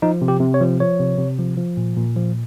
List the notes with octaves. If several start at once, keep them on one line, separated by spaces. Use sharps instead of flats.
F3 D#4
C3
G4
C3
C#5
F3
F3 C#5
C3
C3
F3
F3
A#2
A#2
F3